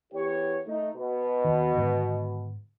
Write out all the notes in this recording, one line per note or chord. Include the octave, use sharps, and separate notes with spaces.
E2 G4 C#5
A3 D#4
B2
D#2 D#3
G#2 D3 D#3